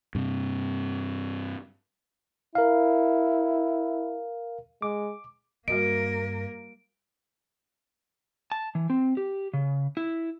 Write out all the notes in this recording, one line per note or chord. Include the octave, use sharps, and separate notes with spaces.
G2 C3
E4 A#4 F5
G#3 D6
G2 G3 A#3 F#4 A#4 D#5 D7
A5
E3
C4
G4
C#3
E4